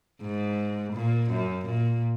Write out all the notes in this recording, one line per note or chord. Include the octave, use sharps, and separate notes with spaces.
G#2
A#2
F#2
A#2